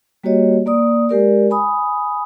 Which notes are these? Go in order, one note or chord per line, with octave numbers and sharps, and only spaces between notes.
G3 A#3 F#4 G4 C#5 D#5
A#3 D5 D#6
G#3 G4 A#4 D5
G#5 B5 D#6